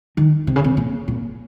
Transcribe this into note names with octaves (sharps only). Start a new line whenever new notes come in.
D#3
C3
C#3
C3
A#2
A#2